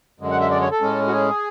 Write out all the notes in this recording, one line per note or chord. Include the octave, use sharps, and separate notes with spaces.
F#2 D3 G#3
F#5
E5
D5
C#5
A4
A2 G#3 C#4
F#4
G#4